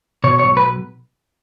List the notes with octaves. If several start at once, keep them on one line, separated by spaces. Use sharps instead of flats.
B2 C#5
C#5
B1
B4